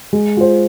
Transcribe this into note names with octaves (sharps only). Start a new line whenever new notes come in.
G#3
F4 C5